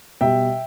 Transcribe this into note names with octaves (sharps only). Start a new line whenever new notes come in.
B2 G3 E5 G5